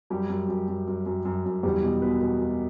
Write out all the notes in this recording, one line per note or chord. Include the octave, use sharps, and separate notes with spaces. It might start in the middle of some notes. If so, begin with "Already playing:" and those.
F#2 G3 G4
F#2
F#2
F#2
F#2
F#2
F#2
F#2
E2 G3 G4
B2
B2 B3 B4
B2
B2